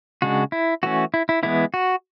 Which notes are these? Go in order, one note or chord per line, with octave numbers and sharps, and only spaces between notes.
C#3 G#3 D4 F#4
E4
E3 A3 C#4 F#4
E4
E4
E3 G#3 B3 E4
F#4